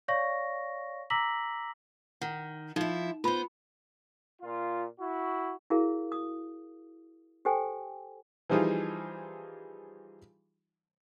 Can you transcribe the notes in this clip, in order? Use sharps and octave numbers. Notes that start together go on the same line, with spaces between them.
C#5 D5 F5 C#6 A#6
A#5 D6 E6 A#6 B6 F#7
D#3 F#5
F3 D#4 E4
B3 F4 C5 B5
A#2 F4
E4 F#4
E4 F#4 G#4 A#4 F5
D#6
G4 A4 C5 G5 G#5
E3 F3 G3 D#4 F4 G#4